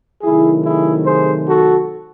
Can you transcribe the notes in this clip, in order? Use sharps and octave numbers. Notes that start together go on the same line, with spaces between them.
C3 D#3 F#3 A3 E4 G#4
E4 G#4
G#4 C5
F#4 A4